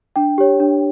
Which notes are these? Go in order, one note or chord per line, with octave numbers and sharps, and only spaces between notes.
D4 G5
G4 C#5
D4